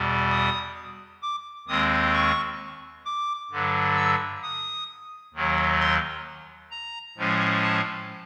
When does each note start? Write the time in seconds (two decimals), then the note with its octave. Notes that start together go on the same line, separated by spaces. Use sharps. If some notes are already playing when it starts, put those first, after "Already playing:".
Already playing: E2 B2 G3
0.31 D#6
1.22 D6
1.68 D#2 D#3 G#3 C4 D#6
2.14 C#6
3.05 D6
3.51 G2 D3 F#3
3.97 E6
4.43 D#6
5.34 D#2 D#3 F#3
5.80 C6
6.71 A#5
7.17 A2 F3 G#3 C#4
7.63 A5